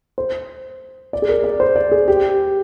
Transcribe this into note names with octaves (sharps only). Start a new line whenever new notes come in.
C5
D5
G#4
A#4
D5
C5
D5
G#4
G4